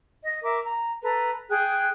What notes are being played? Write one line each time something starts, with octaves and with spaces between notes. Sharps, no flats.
D#5
A#4 E5 D6
A#5
A4 B4 A#5
G#4 G5 F#6